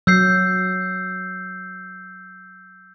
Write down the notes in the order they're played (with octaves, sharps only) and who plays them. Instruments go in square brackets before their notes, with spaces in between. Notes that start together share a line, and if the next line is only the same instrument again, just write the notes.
[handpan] F#3 [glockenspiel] E6 G6 C7